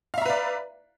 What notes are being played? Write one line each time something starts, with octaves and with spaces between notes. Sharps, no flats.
B4 D5 E5 F5 A#5